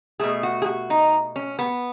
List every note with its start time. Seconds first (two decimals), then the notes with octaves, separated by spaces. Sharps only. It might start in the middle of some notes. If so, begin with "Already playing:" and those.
0.20 B2 A3 G#4
0.43 F#4
0.62 G#4
0.66 F#4
0.90 D#4
1.36 C#4
1.59 B3